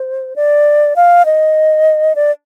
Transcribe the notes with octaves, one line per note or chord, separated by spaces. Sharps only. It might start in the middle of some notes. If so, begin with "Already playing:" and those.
Already playing: C5
D5
F5
D#5
D5